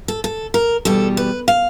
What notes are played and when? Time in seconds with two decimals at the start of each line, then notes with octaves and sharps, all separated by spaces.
0.08 A4
0.24 A4
0.54 A#4
0.85 E2 B2 G3 A4
1.17 B4
1.48 F5